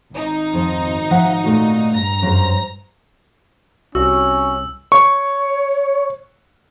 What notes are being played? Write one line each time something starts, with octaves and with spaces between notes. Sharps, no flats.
G#1 D#4
F2 C5 A5
F3 E5 F#5
A#2 A3 F#4
G2 A#5 A#6
F#2 A4 C5
C2 C#4 F#4 E6
C#5 C#6